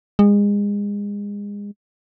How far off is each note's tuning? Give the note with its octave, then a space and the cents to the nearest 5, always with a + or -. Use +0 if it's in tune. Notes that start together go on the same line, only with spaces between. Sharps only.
G#3 -30